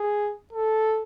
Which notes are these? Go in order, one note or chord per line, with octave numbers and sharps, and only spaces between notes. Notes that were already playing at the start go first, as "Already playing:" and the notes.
Already playing: G#4
A4